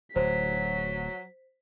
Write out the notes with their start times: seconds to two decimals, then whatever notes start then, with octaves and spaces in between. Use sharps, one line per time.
0.16 D1 F#3 C5 B6